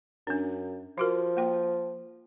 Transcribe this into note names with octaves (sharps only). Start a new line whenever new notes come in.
F#2 C#4 D4
F3 F4 F#4 A#4
A#3 G5